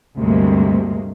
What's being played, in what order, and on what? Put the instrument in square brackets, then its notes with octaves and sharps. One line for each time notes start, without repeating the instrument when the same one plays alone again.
[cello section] D2 G2 C3 G#3 A#3